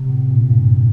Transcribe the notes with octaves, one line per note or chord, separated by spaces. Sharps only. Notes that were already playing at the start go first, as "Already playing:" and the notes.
Already playing: C3
A2
A#2
G2